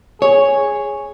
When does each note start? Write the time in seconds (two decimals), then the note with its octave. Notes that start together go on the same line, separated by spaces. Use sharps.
0.22 G#4 C#5